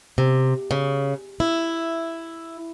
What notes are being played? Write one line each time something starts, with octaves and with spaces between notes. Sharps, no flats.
C3
C#3
E4